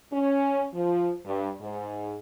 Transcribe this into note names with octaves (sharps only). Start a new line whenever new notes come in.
C#4
F3
G2
G#2